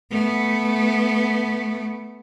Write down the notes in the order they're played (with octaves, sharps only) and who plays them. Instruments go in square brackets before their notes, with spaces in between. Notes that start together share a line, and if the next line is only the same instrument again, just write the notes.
[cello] A3 B3